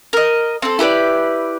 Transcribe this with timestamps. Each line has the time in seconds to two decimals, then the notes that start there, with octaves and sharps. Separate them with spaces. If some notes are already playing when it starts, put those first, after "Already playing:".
0.13 A#4 D#5
0.62 C4 A4
0.79 E4 G4 B4 D5